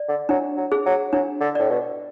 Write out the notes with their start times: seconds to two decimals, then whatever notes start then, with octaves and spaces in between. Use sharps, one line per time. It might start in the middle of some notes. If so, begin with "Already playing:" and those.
Already playing: D5
0.08 D3
0.29 F#3 D4
0.57 F#3
0.72 G#4
0.86 F#3
1.13 F#3 D4
1.41 D3
1.55 A2 D5
1.69 B2